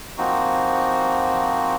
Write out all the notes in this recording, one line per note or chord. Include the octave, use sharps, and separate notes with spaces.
F3 A#3 C4 D#4 F#4